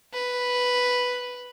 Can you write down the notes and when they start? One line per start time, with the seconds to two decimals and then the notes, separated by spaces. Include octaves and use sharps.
0.14 B4